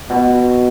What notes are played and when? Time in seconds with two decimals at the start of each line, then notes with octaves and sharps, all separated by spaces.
0.10 B2